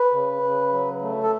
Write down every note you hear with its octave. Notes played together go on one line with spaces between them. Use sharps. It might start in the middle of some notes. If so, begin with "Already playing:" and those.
Already playing: B4
C#3
C#3
F#3
A3
A4